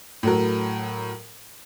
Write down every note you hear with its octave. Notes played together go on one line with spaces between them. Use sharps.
A2 F#3 A#4